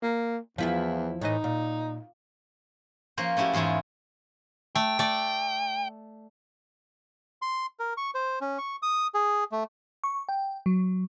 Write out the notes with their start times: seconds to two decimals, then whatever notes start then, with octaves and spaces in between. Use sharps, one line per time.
0.02 A#3
0.58 E2 F3 E4 F4
1.21 A2 E3 D#4 D#5
1.44 A#2
3.17 F3 A#3 C#4 C5
3.37 A3 C#4 E4 F#4 G4
3.53 E2 G#2 C#4 E4 F4
4.75 A3 G5
4.99 A3 D5
7.42 C6
7.79 A#4
7.97 C#6
8.15 C5
8.41 C#4
8.58 C#6
8.83 D#6
9.14 G#4
9.52 A3
10.04 C#6
10.29 G5
10.66 F#3